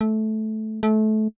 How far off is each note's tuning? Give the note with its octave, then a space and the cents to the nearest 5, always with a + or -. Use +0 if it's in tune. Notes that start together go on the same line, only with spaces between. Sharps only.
A3 -15
A3 -25